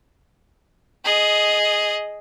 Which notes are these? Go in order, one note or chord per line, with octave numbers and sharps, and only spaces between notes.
G#4 D#5